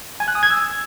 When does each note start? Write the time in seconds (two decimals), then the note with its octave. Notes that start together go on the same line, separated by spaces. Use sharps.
0.20 G#5
0.28 F#6
0.35 D#6
0.43 G#6
0.50 E6